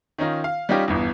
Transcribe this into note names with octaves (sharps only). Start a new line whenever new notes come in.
D#3 C#4 D#4 F4
F5
G3 C#4 D#4 F4 G4
G1 E2